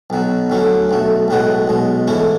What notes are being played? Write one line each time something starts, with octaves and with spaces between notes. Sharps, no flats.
B1 B2 F#3
D2 D3 F#3 C#4
B1 B2 A3
B1 A2 G#3 B3 F#4
B1 B2 G#3
G#2 E3 A3 C#4 E4